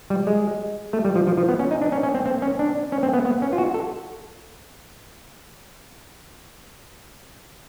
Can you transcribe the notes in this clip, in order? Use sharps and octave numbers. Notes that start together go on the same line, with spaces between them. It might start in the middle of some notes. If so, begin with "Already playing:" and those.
G3
G#3
A3
G3
F3
F3
F3
B3
C#4
D#4
D4
C#4
C#4
C4
C4
C#4
D4
C#4
C4
B3
B3
C#4
F4
F#4
A4